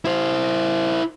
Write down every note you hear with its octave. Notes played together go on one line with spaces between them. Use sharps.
E4 C5